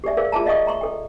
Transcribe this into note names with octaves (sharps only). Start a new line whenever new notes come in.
G4 A4 D5 E5
G#4 A#4 C5 D5 F5
F4 G#4 E5 A5 A#5
D5 D#5 F5 G5 C#6 D#6
E5 A#5 C6 C#6
A4 G5